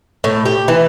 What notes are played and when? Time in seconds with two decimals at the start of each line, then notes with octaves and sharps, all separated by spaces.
0.24 A2
0.46 G4
0.68 E3